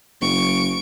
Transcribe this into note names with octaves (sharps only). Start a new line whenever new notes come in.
F#1 C#6 D7